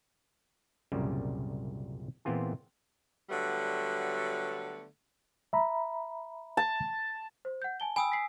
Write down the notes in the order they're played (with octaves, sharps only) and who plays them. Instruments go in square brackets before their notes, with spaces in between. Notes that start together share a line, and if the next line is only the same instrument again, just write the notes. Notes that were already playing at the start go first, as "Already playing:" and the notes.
[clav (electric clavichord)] C2 F#2 A#2 C#3 G3
A#2 E3 B3 C4 F4 G#4
[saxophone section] D3 F#3 G3 A3 B3
[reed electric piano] E5 A#5 B5
[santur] A5
[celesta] C5
F#5 G6
G#5 A5 G7
[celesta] G5 B5 [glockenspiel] G#5 D#6 E6
[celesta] B6 C7